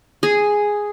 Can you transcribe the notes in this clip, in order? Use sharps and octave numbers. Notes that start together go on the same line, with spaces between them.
G#4